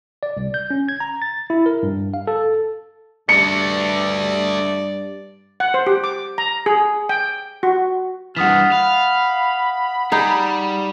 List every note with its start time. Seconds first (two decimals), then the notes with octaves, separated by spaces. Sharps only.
0.23 D5
0.37 C2
0.54 G6
0.70 C#4
0.89 G#6
1.00 A#5
1.22 A6
1.50 E4
1.66 A#4
1.83 G2
2.14 F5
2.27 A4
3.29 G2 A3 D4 D5 C#7
5.60 F#5
5.74 C5
5.87 G4
6.04 D6
6.38 A#5
6.66 G#4
7.09 G5
7.63 F#4
8.37 G2 E3 F4 F#5 D#6 B6
8.72 F5 B5
10.12 G3 D#4 G#4